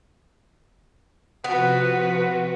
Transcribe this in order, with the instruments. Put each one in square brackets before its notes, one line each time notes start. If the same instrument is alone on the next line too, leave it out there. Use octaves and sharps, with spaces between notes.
[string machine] C3 F3 F4 [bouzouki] B3 [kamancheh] F#4 B4